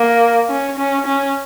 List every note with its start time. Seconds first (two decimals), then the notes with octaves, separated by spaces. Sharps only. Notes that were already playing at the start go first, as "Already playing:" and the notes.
Already playing: A#3
0.49 C#4
0.78 C#4
1.06 C#4